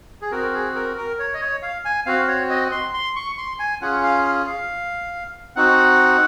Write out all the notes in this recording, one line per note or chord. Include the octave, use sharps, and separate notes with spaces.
G#4
C4 F#4 A#4
G#4
A#4
A#4
C#5
D#5
C#5
F5
G#5
C4 F#4 F5
C#5
D#5
C6
C6
C#6
C6
G#5
C#4 F4 G#4 F#5
F5
F5
C4 D#4 F#4 F#5